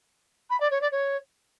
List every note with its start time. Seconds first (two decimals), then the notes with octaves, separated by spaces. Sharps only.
0.50 B5
0.60 D5
0.71 C#5
0.81 D5
0.92 C#5